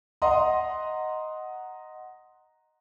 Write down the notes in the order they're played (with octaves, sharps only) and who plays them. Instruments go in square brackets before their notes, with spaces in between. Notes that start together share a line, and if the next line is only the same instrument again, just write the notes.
[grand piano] D#5 F#5 A#5 C6 D#6